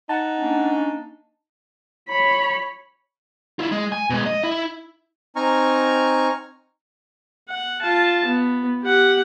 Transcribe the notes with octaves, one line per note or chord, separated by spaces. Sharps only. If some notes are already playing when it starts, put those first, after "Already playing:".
D#4 F#5 A5
A#3 C#4 D4
C#5 B5
E4 F4
G#3
G#5
B2 G#3
D#5
E4
C4 D#4 G#5 A#5 C#6 F6
F#5
F4 A5
B3
G4 F#5